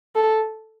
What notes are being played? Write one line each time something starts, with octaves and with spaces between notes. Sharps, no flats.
A4